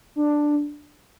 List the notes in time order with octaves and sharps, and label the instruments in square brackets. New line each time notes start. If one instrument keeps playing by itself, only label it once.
[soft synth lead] D4